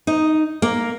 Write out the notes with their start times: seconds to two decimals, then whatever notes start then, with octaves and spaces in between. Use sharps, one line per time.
0.07 D#4
0.62 A#3